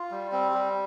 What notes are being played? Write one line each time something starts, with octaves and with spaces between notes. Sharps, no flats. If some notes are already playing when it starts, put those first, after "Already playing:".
Already playing: F4
G3
C4
G3